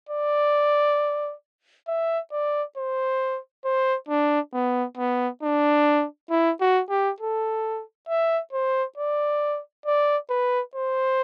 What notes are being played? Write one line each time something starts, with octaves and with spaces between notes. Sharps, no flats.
D5
E5
D5
C5
C5
D4
B3
B3
D4
E4
F#4
G4
A4
E5
C5
D5
D5
B4
C5